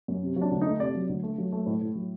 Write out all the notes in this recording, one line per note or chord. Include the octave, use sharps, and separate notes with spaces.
F#2
C3
F#3
D4
D2
A3 D#4
C3 D5
F#3
D2
A3
F#3
A3
A2
A2
F#3